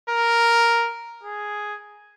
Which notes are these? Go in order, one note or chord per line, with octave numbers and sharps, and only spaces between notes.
A#4
G#4